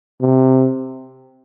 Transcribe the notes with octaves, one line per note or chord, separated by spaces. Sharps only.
C3